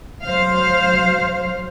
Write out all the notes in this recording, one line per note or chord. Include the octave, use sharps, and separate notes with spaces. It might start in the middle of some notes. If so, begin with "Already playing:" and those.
F#3 C5 F5